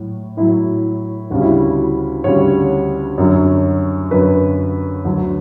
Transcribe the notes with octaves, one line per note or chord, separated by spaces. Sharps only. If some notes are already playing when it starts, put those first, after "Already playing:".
Already playing: A2 F#3
A2 F#3 E4
D2 C#3 G3 F#4
E4
F#4
D2 C#3 G3 C#5
F#2 D3 F#3
F#2 D3 F#3 B4
D2 D3 F#3